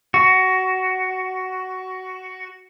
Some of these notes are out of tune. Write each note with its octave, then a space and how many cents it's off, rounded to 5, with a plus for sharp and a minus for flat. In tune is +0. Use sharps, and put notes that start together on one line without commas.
F#4 +15